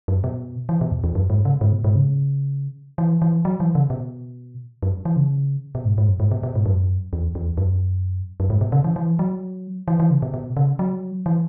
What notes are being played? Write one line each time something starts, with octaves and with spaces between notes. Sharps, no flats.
F#2
B2
E3
B2
E2
E2
F#2
G#2
C#3
G#2
B2
G#2
C#3
E3
E3
F#3
E3
C#3
B2
F#2
E3
C#3
B2
G#2
G#2
F#2
G#2
B2
B2
G#2
F#2
E2
E2
F#2
F#2
G#2
B2
C#3
E3
E3
F#3
E3
E3
C#3
B2
B2
C#3
F#3
E3